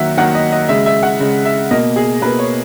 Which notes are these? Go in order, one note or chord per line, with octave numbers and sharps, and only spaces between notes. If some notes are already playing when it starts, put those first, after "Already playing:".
Already playing: D#3 F#3 A#3 E5 F#5
D#3 F#3 A#3 F#5
D#5
D#5
C#3 G#3 E5
E5
F#5
C#3 G#3
E5
B2 A#3 D#5
G#4
B2 A#3 B4
C#5